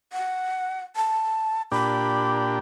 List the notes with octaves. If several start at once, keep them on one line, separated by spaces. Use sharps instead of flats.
F#5
A5
A#2 D4 G4 B5